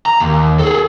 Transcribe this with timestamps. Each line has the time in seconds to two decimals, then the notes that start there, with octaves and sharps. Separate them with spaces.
0.06 A#5
0.20 D#2
0.59 G#4 A4